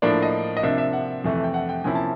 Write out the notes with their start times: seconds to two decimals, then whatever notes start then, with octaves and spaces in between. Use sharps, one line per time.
0.02 A2 F3 A#3 D4 D5
0.22 D#5
0.57 D#5
0.63 C3 F3 A#3 D4 E5
0.78 E5
0.93 F#5
1.24 F2 C3 E3 A3
1.44 G5
1.54 F#5
1.69 G5
1.84 C3 F3 A#3 C#4 E4 G#5
1.95 A5